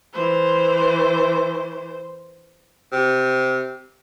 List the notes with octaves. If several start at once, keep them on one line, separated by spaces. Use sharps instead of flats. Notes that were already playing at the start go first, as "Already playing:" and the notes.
E3 C5
C3